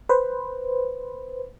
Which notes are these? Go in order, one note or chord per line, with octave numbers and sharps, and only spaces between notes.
B4 C5